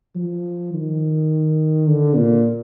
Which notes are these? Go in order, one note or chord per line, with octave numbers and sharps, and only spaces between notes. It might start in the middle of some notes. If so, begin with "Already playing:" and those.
F3
D#3
D3
A#2